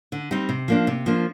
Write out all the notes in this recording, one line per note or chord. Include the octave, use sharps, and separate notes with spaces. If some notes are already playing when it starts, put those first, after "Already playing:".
D3
G3 C4 D#4 G4
C3
F3 A#3 D4
C3
F3 A#3 D4